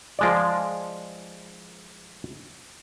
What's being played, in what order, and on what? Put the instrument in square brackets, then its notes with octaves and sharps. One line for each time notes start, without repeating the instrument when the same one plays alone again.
[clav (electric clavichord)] F3 G#3 D5